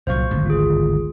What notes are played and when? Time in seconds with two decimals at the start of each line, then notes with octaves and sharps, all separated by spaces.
0.07 C2 A#2 F#3 C5 F5 C#6
0.30 G#1 D2 G2
0.46 F4 G#4